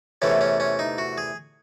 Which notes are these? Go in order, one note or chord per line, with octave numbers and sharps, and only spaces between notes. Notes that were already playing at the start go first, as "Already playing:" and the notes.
E2 C3 E3 A3 C#4
C#4
C#4
D#4
F#4
G#4